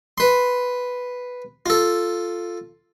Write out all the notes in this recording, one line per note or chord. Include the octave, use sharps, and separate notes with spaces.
B4 C6
F4 A4